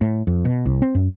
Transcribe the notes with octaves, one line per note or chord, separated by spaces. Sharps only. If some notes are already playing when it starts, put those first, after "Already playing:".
A2
F2
B2
C2
C4
F#2